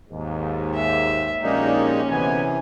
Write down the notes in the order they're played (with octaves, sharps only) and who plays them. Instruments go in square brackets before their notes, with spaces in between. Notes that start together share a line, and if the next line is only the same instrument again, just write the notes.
[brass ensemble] D#2 G#2
[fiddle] E5
[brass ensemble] A#1 G4 D5 [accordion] G#3 A#3 D#4 [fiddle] C#4
[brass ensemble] D2 B3 G#5 [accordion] C3 E3